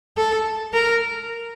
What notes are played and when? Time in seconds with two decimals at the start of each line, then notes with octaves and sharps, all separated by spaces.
0.17 A4
0.73 A#4